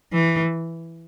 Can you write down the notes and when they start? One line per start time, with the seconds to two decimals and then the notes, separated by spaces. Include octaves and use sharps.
0.13 E3